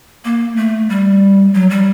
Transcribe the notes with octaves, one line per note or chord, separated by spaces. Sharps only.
A#3
A3
G3
F#3
G3